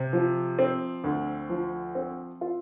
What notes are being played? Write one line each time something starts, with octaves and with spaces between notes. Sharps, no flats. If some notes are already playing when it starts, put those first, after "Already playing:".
Already playing: C3
F3
C4
D2
F3
C4
F4